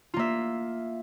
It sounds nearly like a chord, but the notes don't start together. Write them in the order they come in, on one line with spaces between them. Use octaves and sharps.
F4 A#3 E5